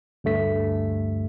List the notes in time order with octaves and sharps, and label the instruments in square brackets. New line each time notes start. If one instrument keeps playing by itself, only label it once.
[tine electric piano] D2 G2 A3 B6